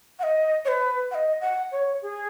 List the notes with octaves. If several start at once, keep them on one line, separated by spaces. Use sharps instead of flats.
F#5
D#5
C#5
B4
F#5
D#5
F#5
C#5
G#4